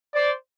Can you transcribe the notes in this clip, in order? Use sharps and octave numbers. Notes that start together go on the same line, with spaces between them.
C5 D5